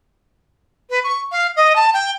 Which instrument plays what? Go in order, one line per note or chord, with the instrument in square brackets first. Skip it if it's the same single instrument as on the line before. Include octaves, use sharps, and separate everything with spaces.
[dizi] B4
C#6
F5
D#5
A5
G5